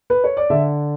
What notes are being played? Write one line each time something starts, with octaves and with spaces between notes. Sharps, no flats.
B4
C#5
D5
D3 E5